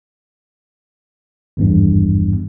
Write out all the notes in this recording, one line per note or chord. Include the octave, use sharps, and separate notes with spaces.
G#1 E2 G2